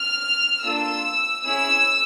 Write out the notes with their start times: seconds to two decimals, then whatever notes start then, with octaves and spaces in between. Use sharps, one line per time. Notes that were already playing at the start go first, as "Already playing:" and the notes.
Already playing: F6
0.64 A#3 D4 F4 A4 E6
1.43 C#4 E4 G#4 E6